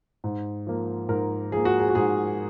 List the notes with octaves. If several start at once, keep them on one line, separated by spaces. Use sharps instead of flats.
G#2
F3 A#3
G#2 A#4
F3 A#3 G#4
F#4
G#4
F#4
G#2 G#4